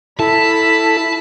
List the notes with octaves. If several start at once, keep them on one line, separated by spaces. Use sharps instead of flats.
E4 A4 A5 B5